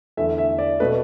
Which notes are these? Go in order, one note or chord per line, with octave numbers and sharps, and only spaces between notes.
E2 D3 A3 E5
E5
D5
B2 A3 B4